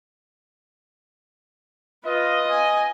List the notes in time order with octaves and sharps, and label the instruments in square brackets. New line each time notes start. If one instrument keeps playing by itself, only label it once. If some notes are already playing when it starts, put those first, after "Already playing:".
[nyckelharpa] F4 B4 [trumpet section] D#5
[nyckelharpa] G#5